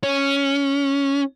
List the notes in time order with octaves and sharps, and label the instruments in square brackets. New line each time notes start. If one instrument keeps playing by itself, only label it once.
[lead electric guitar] C#4